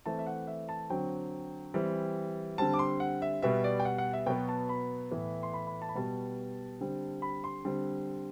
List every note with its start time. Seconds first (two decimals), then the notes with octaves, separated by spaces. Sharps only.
0.06 E3 A3 C4 A5
0.19 E5
0.27 F#5
0.47 E5
0.69 A5
0.90 D3 F#3 C4 G5
1.74 E3 G3 C4
2.58 D3 G3 C4 A5
2.74 D6
2.79 C6
3.00 F#5
3.22 E5
3.42 B2 G3 B3 E5
3.64 D5
3.80 G5
3.85 F#5
3.98 F#5
4.13 E5
4.26 B2 F#3 B3 G5
4.49 A5
4.69 B5
5.11 A2 E3 B3
5.43 C6
5.54 B5
5.67 B5
5.82 A5
5.89 B5
5.95 B2 G3 B3 A5
6.81 D3 G3 C4
7.22 B5
7.44 C6
7.65 D3 G3 C4